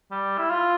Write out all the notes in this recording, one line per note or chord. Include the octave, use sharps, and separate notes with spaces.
G3
E4
F4